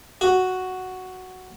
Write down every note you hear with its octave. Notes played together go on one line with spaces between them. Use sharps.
F#4